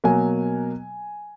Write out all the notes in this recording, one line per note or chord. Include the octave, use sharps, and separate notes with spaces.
B2 F#3 A#3 G#5